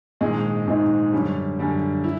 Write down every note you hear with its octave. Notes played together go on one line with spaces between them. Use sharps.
A#1 G#2 D#3 G#3
A#1 G#2 D#3 G#3
F#2 D3 G3
F#2 D3 G3
E4